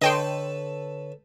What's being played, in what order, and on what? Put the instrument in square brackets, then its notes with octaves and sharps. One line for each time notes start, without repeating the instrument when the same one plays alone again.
[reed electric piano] D3 C#5 [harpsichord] A4 B4 [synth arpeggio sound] D#5 G5 C6